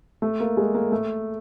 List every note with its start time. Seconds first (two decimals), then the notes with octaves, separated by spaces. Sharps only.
0.22 A3
0.40 A#3
0.57 G#3
0.74 A#3
0.92 A3